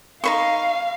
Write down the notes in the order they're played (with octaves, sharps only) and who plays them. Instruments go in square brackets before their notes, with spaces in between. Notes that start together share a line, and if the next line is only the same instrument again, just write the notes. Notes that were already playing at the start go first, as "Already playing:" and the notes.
[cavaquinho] D#4 C5 C#6 [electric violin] F5